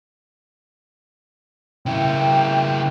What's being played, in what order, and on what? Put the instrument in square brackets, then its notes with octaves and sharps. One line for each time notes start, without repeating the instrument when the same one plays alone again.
[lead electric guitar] C#3 E4 [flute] G5